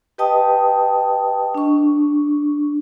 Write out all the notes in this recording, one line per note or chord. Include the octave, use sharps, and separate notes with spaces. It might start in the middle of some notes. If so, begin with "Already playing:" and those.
G4 B4 D#5 G5 A5 D#6
D4 C#6